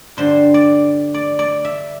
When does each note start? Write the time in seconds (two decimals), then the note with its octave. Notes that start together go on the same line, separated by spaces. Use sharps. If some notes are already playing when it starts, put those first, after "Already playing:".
0.17 G2 D3 G3 C5
0.54 D5
1.14 D5
1.39 D5
1.65 E5